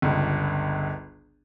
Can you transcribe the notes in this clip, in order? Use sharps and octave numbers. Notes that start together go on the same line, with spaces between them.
G1 C#2